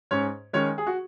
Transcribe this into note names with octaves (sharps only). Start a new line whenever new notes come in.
G#2 C#4 C#5
D#3 G#3 C#4 C#5
G#4
F#4